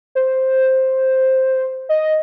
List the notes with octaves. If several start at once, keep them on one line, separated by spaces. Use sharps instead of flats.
C5
D#5